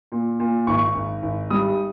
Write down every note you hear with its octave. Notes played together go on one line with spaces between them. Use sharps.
A#2
A#2
G#1 C#6
G#1
G#1
G3 D#6